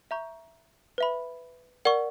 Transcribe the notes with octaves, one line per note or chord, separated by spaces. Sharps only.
E5 A#5 C#6 G6
B4 E5 B5
A#4 D5 F#5 C#6